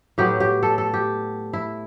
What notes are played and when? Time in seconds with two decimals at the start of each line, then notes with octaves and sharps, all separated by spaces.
0.18 A2 F#3 B3 G4
0.40 G4
0.63 A4
0.78 A4
0.93 G4
1.53 E4